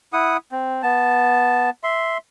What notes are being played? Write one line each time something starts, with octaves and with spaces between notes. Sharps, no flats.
E4 F#5 D#6
C4
B3 A5
E5 C6